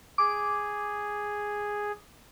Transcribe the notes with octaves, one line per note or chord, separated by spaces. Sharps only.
G#4 D6